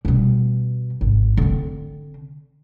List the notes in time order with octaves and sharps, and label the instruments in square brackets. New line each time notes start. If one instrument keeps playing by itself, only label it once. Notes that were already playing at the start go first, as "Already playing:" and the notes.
[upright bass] B2 G3
G#1
D3 C4